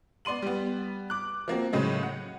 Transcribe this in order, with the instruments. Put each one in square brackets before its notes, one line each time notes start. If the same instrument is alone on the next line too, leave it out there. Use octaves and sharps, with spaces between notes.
[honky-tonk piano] B3 D5 C6 D#7 F#7
G3 B3
D6 F#6
F3 A#3 C4 F#4
A2 C#3 F#3 G#3
F#5